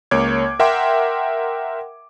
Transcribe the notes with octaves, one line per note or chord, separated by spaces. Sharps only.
C#2 A#3 C#5 D6 G#6
A#4 E5 F#5 G5 C6 D6